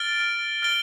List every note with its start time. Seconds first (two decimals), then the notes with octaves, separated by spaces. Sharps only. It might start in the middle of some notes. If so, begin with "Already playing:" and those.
Already playing: F6 A6 D7 G7
0.62 F6 A6 D7 G7